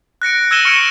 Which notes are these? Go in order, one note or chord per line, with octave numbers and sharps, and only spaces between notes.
F#6 A#6 C#7 D7
E6 G#6 A#6 D#7 E7 G7
C#6 F6 C#7 D7 E7